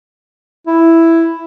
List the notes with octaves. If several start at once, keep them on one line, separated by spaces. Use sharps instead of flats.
E4